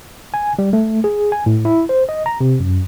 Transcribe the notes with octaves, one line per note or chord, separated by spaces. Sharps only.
G#5
G3
A3
G#4
G#5
A2
E4
C5
D#5
A#5
C3
F#2